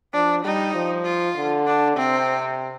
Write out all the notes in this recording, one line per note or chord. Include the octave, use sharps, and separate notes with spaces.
F3 D4
G3 D#4
F3
F4
D3
D4
C3 C4